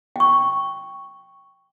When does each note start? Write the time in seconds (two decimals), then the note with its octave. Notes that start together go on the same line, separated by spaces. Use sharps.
0.16 G5 C#6